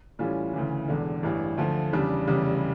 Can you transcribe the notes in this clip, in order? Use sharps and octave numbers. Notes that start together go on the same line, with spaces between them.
A2 E3 G3 C#4 F4
D2 C#3 E3
E1 E2 D3
A1 G2 E3
D2 D3 F3 A3
E2 C#3 G3 D4
F1 E2 C#3 G3